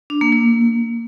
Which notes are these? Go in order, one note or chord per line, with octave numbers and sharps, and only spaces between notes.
D4
A#3
A#3